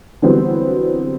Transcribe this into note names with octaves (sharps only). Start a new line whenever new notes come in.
D3 E3 F#3 G3 B3 C4